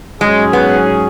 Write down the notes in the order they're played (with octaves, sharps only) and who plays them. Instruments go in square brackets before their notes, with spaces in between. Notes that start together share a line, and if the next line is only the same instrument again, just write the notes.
[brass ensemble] G#2 F#3 C#4 G#4 [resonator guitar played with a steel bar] G#3
[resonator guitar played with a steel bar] B3